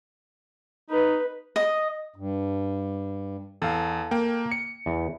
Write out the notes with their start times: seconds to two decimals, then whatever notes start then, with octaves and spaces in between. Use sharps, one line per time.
0.90 D#4 B4
1.56 D#5
2.16 G2
3.62 E2 A4 F5
4.11 A#3 G5
4.52 C#7
4.86 E2